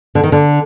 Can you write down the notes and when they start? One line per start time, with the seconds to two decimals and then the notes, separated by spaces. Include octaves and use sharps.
0.15 D3
0.24 D#3
0.32 D3